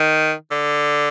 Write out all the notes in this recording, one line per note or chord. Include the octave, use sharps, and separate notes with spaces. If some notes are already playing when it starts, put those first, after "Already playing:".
Already playing: D#3
D3